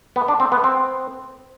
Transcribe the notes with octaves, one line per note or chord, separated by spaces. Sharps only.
B3
D4
C4
B3
C4